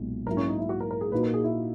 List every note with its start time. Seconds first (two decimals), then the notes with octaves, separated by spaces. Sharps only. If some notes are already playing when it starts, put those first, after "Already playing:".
Already playing: B1 A#2 G#3
0.27 G#2 F#3 A#3 E4 A#4
0.37 C#4
0.48 D#4
0.59 E4
0.69 F#4
0.80 A#4
0.91 A#4
1.01 G#4
1.12 A#2 A#3 D#4 F#4 B4
1.23 A#4
1.34 G#4
1.44 E4